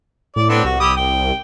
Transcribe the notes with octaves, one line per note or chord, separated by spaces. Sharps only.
A2 D5
B3 C4 D4
C2 F#4
E4 G4 D#6
G5